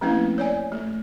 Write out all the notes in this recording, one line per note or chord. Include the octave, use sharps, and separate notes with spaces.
F3 A3 A#3 C4 C#4 E4
C#5 D5 G#5
A3